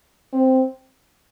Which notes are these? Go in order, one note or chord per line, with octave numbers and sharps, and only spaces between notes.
C4